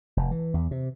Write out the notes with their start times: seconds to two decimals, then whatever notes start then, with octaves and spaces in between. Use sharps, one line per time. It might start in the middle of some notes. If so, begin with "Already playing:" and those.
0.17 F1
0.31 E3
0.54 E2
0.71 C3